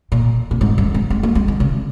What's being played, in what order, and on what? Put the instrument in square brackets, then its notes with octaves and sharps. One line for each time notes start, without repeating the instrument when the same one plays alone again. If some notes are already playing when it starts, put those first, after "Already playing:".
[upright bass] A#2
A#2
G#2
F#2
G#2
G#3
A#3
G#3
D#3
C#3